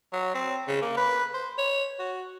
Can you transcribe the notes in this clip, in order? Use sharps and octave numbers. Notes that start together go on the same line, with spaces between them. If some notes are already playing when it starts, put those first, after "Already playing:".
F#3
C4
C#3
A#3
B4
C5
C#5
F#4